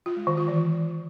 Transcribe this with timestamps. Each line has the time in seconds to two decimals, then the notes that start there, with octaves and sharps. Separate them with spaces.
0.06 F4
0.16 G#3
0.27 D#3
0.37 F4
0.48 E3